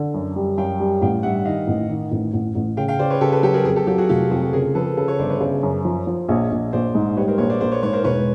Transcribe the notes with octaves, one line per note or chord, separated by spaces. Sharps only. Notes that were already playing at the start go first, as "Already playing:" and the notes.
Already playing: D3
F#2
G3
F#2 F5 G5
G3
A1 F5 G5
G2 E5 F#5
D#3 D#5 F5
A1
D#3
A1
A1
A1
C#3 F5 G5
F5 G5
C#3 C5 D5
B4 C#5
C#3 G4 A4
A4 B4
F#3 G4 A4
G#4 A#4
F2 G#4 A#4
G4 A4
F#3 F4 G4
F#4 G#4
F1 F4 G4
F2 F#4 G#4
C#3 G#4 A#4
F3 A4 B4
C#3 A4 B4
B4 C#5
G1 C5 D5
B4 C#5
C#3 C5 D5
F#2
F3
F3
A#1 C#5 D#5
A#1
A#1 C5 D5
G#2
G3 B4 C#5
A#4 C5
A#1 B4 C#5
C5 D5
A#1 C5 D5
B4 C#5
G#2 B4 C#5
A#4 C5
E1 B4 C#5